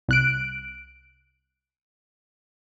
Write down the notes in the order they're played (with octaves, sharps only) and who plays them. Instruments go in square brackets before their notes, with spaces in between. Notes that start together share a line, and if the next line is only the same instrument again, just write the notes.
[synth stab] C2 F#6 D7